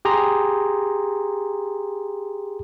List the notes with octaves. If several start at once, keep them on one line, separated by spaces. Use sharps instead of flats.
G4 G#4 A#5 C6